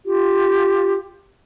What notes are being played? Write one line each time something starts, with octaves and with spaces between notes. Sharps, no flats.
F4 G4